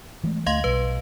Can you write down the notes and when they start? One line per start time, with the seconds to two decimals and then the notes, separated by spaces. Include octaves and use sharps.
0.24 E3 G#3 A3
0.46 D2 A3 D#5 F5 C6
0.64 B1 G3 B4